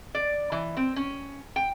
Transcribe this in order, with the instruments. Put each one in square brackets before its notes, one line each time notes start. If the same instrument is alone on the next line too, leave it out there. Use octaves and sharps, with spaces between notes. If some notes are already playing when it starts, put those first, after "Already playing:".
[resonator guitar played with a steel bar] D5
E3
C4
C#4
G5